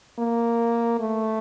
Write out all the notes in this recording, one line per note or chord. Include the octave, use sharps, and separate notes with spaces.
A#3
A3